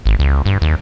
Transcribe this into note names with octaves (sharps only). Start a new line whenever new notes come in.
G#1
C#2
G2
D#2